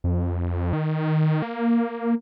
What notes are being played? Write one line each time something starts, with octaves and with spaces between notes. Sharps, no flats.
F2
D#3
A#3